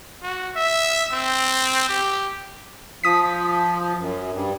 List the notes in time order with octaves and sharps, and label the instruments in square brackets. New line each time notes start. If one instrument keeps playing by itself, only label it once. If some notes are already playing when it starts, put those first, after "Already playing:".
[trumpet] F#4
E5
C4
G4
[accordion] F3 [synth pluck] D#6 B6
[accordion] F#2
G2